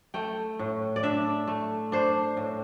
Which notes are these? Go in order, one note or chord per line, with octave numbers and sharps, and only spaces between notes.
A3 G5
A2
D5
D4 E5
A3
D4 C5
A2